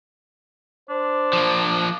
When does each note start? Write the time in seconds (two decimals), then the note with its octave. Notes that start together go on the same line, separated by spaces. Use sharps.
0.90 D4 C5
1.33 F3 A#3